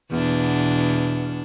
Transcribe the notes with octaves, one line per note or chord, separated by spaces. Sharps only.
E2 B2 D4